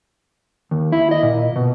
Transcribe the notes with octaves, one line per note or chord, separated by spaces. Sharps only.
D#2
E4
D#5
A#2
B2